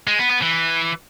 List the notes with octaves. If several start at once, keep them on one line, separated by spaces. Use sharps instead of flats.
G#3
B3
B3
E3